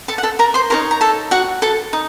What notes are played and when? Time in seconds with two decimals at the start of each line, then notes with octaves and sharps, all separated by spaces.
0.08 A4 A5
0.18 F#5
0.23 A4 A5
0.39 A#4 A#5
0.54 C5 C6
0.70 D#4 A4 A#4 C#5 A#5
0.91 A#5
1.01 A4 A5
1.31 F#4 F#5
1.62 A4 A5
1.93 D#4